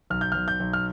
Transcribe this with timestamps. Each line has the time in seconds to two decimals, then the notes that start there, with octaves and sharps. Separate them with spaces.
0.10 B1 F6
0.21 G6
0.32 B1 F6
0.48 G6
0.60 B1
0.73 F6